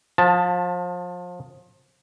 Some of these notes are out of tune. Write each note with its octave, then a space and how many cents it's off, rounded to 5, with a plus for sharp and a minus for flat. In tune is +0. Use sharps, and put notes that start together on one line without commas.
F3 +30 A5 +0